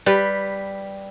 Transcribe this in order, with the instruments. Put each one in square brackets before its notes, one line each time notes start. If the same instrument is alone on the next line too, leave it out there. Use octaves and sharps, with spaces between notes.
[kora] G3 B4